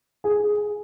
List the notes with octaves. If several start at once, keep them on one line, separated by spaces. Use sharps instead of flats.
G#4